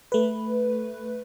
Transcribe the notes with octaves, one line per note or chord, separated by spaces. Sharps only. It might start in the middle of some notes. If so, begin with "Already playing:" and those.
A3 B4